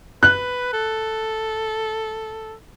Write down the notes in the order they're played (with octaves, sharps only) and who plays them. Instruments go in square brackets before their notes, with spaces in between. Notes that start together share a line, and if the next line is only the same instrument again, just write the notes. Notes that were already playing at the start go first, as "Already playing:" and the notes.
[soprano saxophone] B4 [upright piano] F#6
[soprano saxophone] A4